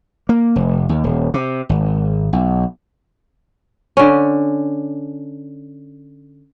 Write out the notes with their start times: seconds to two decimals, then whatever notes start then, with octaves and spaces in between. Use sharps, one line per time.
0.29 A#3
0.56 F1
0.89 D#2
1.04 D#1
1.34 C3
1.69 G#1
2.33 B1
3.97 D3 C#4